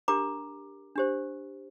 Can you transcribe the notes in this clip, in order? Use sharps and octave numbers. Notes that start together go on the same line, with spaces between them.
D4 G4 A#4 A#5 D6
D4 G4 C5